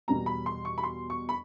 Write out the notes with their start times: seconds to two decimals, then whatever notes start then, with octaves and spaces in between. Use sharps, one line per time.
0.08 E2 B2 G3 B3 A#5
0.26 B5
0.46 C6
0.65 C#6
0.78 B5
0.83 C6
1.10 C#6
1.29 B5